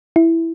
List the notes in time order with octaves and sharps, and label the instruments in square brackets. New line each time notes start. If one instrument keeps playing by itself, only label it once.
[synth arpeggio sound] E4